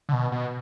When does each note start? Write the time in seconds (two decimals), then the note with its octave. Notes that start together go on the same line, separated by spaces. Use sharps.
0.09 D3
0.13 B2
0.32 B2